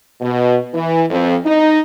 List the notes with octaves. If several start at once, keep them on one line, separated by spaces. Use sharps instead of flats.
B2
E3
F2
D#4